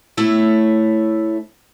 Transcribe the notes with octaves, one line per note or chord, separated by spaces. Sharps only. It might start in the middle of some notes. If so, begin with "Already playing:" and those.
A3 E4 C#5